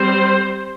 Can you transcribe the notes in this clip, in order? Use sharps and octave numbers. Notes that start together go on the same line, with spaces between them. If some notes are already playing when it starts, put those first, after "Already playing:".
Already playing: G3 C4 C5